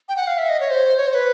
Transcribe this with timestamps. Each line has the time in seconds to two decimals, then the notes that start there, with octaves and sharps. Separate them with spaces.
0.09 G5
0.16 F#5
0.27 F5
0.38 E5
0.49 D#5
0.60 C#5
0.70 C5
0.97 C#5
1.07 C5
1.14 B4